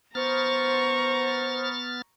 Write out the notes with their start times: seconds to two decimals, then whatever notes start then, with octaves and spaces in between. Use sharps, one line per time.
0.15 B3 C5 A#5 C#6 F6 A6